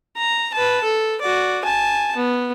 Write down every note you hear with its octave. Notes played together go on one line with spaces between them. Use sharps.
A#5
B4 A5
A4
F#4 D5
G#5 A5
B3